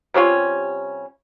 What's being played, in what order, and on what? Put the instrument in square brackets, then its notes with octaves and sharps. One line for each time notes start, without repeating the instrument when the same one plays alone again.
[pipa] C3 G3 C#4 F4